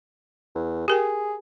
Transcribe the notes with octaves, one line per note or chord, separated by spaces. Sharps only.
E2
G4 G#4 A#4 G5